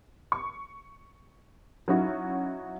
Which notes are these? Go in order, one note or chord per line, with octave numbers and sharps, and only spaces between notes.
C#6
F#3 C#4 D#4 E4 F#4